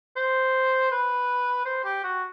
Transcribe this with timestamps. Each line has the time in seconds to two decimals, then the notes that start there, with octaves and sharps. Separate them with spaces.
0.17 C5
0.92 B4
1.65 C5
1.84 G4
2.04 F#4